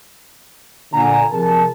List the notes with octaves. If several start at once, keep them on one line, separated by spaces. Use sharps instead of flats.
A#2 D3 G#5 A#5
C3 F3 G#4 A#4 A5